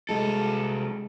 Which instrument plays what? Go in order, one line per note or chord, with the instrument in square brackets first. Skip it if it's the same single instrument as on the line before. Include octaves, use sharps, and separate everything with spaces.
[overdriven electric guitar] C2 A4 [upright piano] G#3